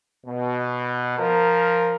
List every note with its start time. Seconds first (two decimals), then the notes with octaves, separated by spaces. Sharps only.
0.24 B2
1.18 F3 A#4